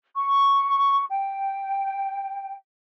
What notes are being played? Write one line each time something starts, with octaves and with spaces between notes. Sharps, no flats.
C#6
G5